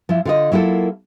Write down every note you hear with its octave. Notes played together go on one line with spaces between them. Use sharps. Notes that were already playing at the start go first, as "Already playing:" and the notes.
F3 E4
D3 F4 D#5
F#3 A#3 E4 F4 A4